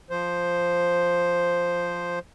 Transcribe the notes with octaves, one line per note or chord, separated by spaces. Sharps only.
F3 C5